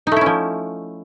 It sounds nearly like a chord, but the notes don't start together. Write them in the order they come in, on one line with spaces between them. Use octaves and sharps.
D#4 A3 E4 C#4 F3